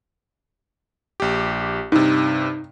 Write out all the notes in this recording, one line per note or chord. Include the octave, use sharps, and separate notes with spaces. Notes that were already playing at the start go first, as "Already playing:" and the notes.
A#1 G4
G2 C3 D#4